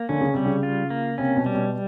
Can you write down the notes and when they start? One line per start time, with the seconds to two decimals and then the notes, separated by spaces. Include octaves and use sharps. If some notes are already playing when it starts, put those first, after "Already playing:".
Already playing: A#3
0.09 D3 C#4
0.21 C#3
0.34 C3 G3
0.46 C#3
0.63 F4
0.90 A#3
1.18 C3 C#4
1.37 B2
1.46 G3
1.55 B2